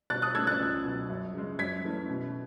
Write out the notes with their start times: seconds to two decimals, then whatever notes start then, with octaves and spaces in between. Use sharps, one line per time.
0.10 B2 F#6 A6
0.22 D#6 F#6
0.35 A3 C#4 E6 G#6
0.47 F#6 A6
0.60 C#2
0.84 B2 F#3
1.09 F#2
1.34 C#3 G#3
1.58 F#2 G#6 B6
1.84 E3 A3 C#4
2.09 B2